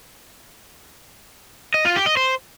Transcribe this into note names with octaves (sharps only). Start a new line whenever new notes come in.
D#5
F4
G4
D#5
C5